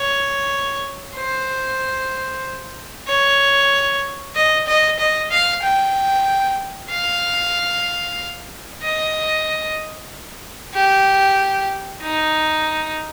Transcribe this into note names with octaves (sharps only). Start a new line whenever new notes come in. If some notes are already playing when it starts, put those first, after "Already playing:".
Already playing: C#5
C5
C#5
D#5
D#5
D#5
F5
G5
F5
D#5
G4
D#4